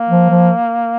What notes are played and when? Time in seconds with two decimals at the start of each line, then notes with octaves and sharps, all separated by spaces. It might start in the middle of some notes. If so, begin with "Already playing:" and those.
Already playing: A#3
0.10 F3
0.30 F3